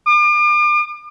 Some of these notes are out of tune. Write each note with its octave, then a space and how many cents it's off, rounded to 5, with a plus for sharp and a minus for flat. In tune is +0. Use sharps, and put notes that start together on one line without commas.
D6 +40